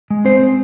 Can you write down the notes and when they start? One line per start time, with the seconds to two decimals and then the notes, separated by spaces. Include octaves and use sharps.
0.10 G#3
0.25 C4 C5